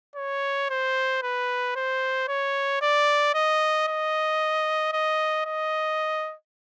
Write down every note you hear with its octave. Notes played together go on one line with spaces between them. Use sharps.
C#5
C5
B4
C5
C#5
D5
D#5
D#5
D#5
D#5